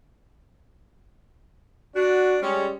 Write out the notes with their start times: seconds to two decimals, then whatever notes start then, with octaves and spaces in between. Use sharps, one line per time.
1.96 D4 F#4
2.42 G3 G#3 C#4